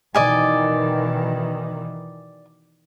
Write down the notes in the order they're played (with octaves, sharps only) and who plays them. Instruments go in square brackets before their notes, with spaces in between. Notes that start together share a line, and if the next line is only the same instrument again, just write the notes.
[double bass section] B2 D#3 E3 [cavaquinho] D5 D#5 G#5